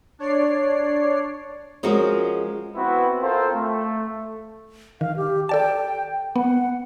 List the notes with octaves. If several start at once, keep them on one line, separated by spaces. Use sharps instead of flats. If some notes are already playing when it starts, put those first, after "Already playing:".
D4 C#5 D5 C7
F3 G#3 C#4 F#4 A#4
B3 C4 E4 F#4 B4
C4 F4 A4 A#4 C5
A3
D#3 F5
G4
A4 D5 G5 A5
B3 F#5